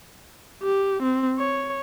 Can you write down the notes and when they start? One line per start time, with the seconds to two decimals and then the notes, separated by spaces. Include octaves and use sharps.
0.63 G4
1.03 C4
1.39 C#5